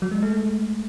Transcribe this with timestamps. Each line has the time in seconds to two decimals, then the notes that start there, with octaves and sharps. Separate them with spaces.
0.02 F#3
0.11 G#3
0.22 A3